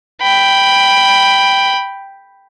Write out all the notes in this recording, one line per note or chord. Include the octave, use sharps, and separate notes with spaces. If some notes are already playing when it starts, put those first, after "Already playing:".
G5 B5